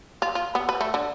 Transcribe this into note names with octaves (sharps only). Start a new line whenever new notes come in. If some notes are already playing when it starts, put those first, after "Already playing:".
F4
F4
B3
B4
A3
D3